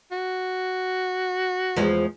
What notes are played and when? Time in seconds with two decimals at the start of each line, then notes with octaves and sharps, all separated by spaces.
0.11 F#4
1.76 E2 F3 G#3